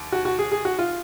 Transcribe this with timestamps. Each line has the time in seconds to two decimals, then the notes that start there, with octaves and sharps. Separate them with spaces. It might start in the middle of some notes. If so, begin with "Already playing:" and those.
Already playing: D#2
0.12 F#4
0.25 F#4
0.39 G#4
0.52 G#4
0.65 F#4
0.79 F4